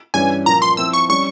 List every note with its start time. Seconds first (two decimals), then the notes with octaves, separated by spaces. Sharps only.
0.14 G2 E3 G3 C#4 G#5
0.46 A#2 F3 A#3 A#5
0.62 C6
0.77 F3 C4 E4 E6
0.93 C#6
1.09 G3 C#4 C#6